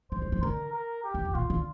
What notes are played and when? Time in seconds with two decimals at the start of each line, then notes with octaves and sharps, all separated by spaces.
0.11 G3 C5
0.22 G3
0.32 F3
0.43 D3 A#4
0.73 A#4
1.04 G4
1.14 F2
1.25 F2
1.35 A#2 F4
1.50 D3